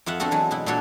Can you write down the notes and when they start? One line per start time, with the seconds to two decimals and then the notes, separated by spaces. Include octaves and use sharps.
0.06 F2 F4 E5 F#5
0.20 D3 B3 C4 F#4 A4 F#5
0.31 E3 F#3 G#3
0.51 B2 B3 E4
0.66 A#2 D4 F#4 A4 C#5 C6